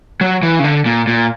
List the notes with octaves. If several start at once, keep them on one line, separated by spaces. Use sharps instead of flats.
F#3
E3
C#3
D3
A#2
A#2